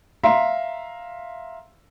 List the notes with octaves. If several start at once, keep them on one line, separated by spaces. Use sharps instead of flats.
E5 F5 A#5 C6